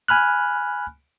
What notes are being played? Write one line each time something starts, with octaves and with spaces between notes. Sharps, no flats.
G#5 B5 F6 F#6